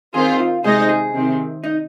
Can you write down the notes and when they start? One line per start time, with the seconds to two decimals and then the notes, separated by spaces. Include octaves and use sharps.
0.14 D#3 C4 F4 G#4 C5
0.39 F4
0.63 C3 G#3 D#4 G#4 C5 D#5
0.89 G#4
1.13 C3 D#3 C4
1.64 D#4